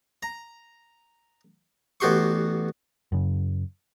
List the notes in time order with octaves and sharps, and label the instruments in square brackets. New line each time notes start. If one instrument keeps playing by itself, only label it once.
[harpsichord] A#5
A1 B3 F#4 G4 C6 C#6
[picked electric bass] F#2 C#3